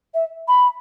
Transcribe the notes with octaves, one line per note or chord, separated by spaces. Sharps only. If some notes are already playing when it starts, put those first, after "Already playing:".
E5
B5